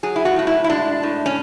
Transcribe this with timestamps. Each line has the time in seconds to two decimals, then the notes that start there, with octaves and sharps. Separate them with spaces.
0.03 F#3 G#4
0.16 E4
0.25 F#4
0.36 A2 F#4
0.47 E4
0.64 E4
0.69 G#3 D4
1.03 A2
1.26 C#4